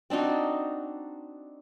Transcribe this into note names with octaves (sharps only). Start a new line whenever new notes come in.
C4 D4 D#4 F#4